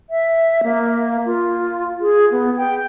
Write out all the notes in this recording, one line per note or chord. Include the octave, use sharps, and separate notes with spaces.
E5
A#3
F4
G#4
B3
G5